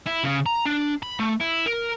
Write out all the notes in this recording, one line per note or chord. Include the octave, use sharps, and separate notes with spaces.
E4
C#3
A#5
D4
B5
A3
E4
A#4